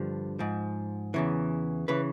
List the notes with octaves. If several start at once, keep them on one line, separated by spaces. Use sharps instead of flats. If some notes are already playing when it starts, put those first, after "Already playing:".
Already playing: G2 D3 F3
G#2 F3
E2 C#3 E3
C#3 E3 B4